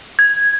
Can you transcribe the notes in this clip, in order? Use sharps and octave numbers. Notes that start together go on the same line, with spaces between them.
G#6